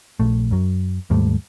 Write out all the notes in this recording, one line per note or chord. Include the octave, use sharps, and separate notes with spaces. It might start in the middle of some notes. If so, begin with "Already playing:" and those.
A#1 A3
F#2 F#3
D#2 G#2 G3 A3